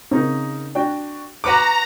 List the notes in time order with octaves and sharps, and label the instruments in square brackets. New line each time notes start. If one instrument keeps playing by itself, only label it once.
[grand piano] C#3 D#4 A#4 [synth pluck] C4
[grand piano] D4 F#4 G5
[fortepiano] F#4 B4 D6 [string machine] A#5 [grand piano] F#6 C#7